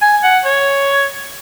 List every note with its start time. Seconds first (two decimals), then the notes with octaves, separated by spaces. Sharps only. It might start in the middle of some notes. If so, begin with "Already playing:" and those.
0.02 G#5
0.23 F#5
0.45 C#5